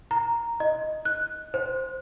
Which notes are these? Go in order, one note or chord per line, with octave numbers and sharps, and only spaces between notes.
A#5
D#5
F#6
C5